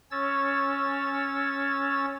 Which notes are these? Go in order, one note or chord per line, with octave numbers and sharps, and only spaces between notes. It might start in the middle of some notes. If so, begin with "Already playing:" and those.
C#4 C#5 E6 A6